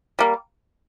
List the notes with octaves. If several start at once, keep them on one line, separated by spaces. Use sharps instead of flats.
G3 A#3